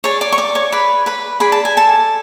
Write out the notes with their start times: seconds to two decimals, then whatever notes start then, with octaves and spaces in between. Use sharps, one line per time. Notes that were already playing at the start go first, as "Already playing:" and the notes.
0.04 G#4 C#5 D5 C#6
0.21 D5 D6
0.32 C#6
0.38 D5 D6
0.55 C#5 C#6
0.72 G#4 B4 D5 B5
1.06 B4 B5
1.40 G#4 D5 B5
1.52 A5
1.65 G#5
1.77 A4 A5